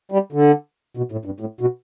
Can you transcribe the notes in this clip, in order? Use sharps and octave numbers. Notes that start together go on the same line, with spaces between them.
G3
D3
B2
A2
G2
A2
B2